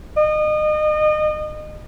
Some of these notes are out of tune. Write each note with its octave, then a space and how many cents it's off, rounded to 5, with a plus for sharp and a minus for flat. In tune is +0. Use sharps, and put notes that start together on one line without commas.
D#5 -30